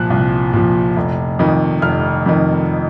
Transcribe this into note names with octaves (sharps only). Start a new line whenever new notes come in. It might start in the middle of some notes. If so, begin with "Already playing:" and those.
Already playing: C2 A#2 F3 F#6
C2
A#2 F3
F1
F2 D#3
F1 F6
F2 D#3